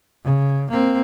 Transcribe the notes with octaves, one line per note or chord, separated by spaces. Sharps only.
C#3
A#3 C4